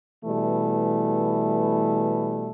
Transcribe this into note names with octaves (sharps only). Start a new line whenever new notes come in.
B2 E3 G3 A3